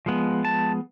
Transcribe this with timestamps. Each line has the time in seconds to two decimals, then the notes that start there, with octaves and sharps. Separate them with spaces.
0.06 F3 G#3 B3
0.45 A5